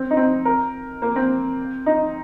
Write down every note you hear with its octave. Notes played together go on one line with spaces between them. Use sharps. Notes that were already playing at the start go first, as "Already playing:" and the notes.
Already playing: C4
D#4
C4
A#4
A#3
C4
D#4